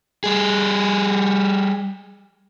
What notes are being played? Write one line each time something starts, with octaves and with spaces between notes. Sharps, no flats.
G3 G#4